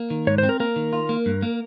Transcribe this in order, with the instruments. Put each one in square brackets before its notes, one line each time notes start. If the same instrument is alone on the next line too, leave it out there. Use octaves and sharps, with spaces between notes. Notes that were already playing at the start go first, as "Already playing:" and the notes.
Already playing: [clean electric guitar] A#3
D#3
[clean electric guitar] G#2 [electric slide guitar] C#5
[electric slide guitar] C5
[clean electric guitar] C4
[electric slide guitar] A#4
[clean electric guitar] A#3 [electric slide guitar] A#4
[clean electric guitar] D#3
F4
A#3
G2
A#3